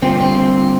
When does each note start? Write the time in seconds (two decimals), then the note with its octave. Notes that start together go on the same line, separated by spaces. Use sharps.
0.02 D3 G3 A#3 C4 F4 C5
0.21 C4